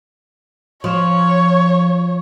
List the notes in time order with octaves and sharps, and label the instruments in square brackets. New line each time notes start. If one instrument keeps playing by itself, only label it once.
[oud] F3 [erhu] C#5